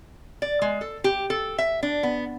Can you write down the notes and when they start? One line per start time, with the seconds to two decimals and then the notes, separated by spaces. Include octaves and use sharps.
0.42 D5
0.62 G#3
0.81 A4
1.04 G4
1.30 A4
1.58 E5
1.83 D4
2.03 B3